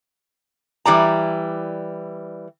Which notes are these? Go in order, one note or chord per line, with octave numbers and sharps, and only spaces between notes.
E3 G3 D5 A#5